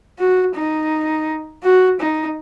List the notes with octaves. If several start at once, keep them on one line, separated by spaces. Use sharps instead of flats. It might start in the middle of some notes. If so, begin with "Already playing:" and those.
F#4
D#4
F#4
D#4